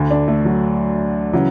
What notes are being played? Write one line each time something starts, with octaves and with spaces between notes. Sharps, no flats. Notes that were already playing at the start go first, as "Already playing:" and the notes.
Already playing: D2 D3
D4
A3
F#3
C#3 E3 F#3